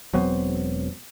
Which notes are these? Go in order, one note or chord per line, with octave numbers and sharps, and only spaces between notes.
E1 F#3 B3 C4